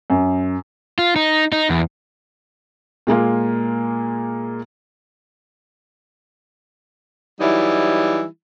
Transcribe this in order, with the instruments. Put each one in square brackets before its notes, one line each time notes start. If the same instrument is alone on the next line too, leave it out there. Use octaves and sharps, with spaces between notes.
[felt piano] F#2
[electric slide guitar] F4
D#4
D#4
E2
[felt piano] A#2 G#3 A#3 F4
[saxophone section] E3 F#3 G3 D#4 E4